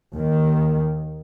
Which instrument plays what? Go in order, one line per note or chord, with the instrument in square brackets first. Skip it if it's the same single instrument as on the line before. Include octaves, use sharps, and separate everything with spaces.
[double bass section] D#2 D#3